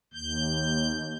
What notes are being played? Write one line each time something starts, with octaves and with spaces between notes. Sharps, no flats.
D#2 G6